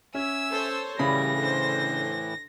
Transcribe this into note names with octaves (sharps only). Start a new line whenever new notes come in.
C#4 E5 G#5 E6
A4 C5 C#5
A2 C#3 E3 G3 B5 A#6
D3 C5